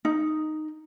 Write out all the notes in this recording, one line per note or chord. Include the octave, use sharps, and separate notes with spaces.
D#4